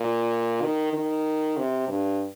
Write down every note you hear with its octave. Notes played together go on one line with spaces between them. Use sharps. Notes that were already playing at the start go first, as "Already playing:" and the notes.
Already playing: A#2
D#3
D#3
C3
G2